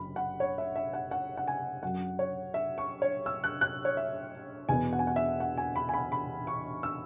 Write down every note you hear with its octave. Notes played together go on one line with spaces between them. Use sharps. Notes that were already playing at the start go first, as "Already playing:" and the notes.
Already playing: F#1 F#2 B5
F#5
C#5
E5
E5
F#5
F#5
F#5
G#5
F#2 F#3 C#4 F#5
C#5
E5
C#6
C#5
E6
F#6
F#6
C#5
E5
E2 B2 B3 G#5
F#5
G#5
F#5
E5
F#5
G#5
B5
G#5
B5
B5
C#6
E6